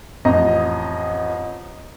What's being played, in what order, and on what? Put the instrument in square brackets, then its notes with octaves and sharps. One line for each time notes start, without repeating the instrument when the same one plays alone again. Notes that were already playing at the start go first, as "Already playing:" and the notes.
[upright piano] A1 F2 D#5 A#5